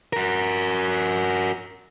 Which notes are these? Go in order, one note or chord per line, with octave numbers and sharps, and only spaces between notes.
F#4 A#4